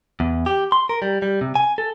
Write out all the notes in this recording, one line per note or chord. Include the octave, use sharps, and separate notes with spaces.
E2
G4
C6
A#4
G3
G3
C3
G#5
A4